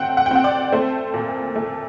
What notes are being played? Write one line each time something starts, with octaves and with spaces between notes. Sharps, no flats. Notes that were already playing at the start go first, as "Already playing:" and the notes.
Already playing: A3 C4 F#5 G5
F#5
G5
C4 F#5
D5
A3 C5
A#2
A3